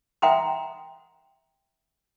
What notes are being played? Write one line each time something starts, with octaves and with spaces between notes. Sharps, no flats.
E5 F#5 G5 A#5 C6 D#6